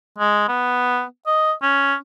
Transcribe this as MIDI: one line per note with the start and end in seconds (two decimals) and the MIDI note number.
0.18 0.46 56
0.48 1.04 59
1.27 1.52 75
1.62 1.95 61